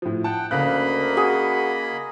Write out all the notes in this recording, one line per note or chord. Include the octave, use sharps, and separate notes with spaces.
A2 F3
F#5 G5 A5
D2 C#3 A#3 D#5 F5 B5 F#6
F#4 G#4